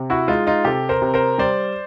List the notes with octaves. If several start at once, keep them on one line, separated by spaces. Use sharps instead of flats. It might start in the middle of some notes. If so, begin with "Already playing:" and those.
Already playing: C3
E4 F#4
G#3 D#4 F4
D#4 F4
C3 G4 A4
A#4 C5
C3
A#4 C5
G3 C5 D5